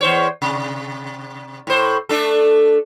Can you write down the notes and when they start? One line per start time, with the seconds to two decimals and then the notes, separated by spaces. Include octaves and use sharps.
0.01 E2 C5 C#5
0.42 C3
1.67 A2 C5
2.09 A3 D4 A4